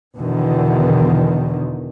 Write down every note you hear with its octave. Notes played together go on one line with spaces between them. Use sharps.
E2 B2 D3 D#3